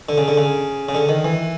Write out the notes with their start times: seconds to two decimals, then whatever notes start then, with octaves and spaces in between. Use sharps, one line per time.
0.09 D3
0.18 C#3
0.28 D3
0.37 C#3
0.89 C#3
0.95 D3
1.09 D#3
1.24 E3